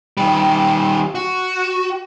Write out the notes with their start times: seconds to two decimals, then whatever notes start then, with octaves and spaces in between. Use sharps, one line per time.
0.17 D#3 G3
1.15 F#4